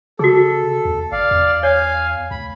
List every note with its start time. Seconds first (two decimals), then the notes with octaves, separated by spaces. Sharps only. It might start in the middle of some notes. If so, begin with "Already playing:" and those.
0.19 C#3 F#4 G#4 A4
0.85 D#2
1.12 G1 D5 F5
1.31 E2
1.63 C#5 F5 G#5
2.31 D2 B5